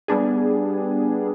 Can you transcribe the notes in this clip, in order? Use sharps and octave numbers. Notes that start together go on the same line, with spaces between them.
G3 B3 D4 G#4